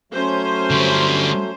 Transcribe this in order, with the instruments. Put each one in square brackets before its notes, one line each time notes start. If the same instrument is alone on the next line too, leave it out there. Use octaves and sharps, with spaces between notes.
[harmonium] F#3 A3 [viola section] C#4 C5
[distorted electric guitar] D3 G3